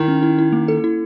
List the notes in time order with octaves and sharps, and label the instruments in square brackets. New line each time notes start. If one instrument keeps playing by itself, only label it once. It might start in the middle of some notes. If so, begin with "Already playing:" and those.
Already playing: [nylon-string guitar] D#3 [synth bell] E4
[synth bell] C#4
E4
E4
A#3
A4
E4